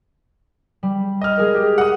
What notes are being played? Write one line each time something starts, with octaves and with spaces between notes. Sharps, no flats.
G3
D#5 F6
G#3 G#4 A#4
G4
F#5 D#6